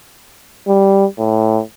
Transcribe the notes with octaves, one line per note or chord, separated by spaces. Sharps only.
G3
A2